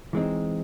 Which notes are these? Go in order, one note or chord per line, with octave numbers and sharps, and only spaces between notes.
E3 G#3 C4 D#4